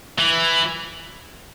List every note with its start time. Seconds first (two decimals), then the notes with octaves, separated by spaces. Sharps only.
0.19 E3